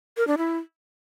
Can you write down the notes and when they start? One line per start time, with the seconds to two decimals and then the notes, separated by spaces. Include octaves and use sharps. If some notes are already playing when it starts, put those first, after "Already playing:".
0.17 A#4
0.27 D4
0.38 E4